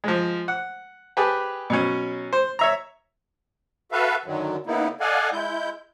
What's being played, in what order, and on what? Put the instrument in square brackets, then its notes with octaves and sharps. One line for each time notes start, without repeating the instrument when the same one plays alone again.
[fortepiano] F3 G#3
F#5
G4 G#4 B4 A5
B2 F#3 C#4
C5
C#5 E5 A#5
[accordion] F#4 A4 B4 E5 F5
F#2 D3 D#3 F#3
C#3 A#3 B3 D#4 E4
A4 D5 D#5 F5 F#5 G#5
G#3 E4 G6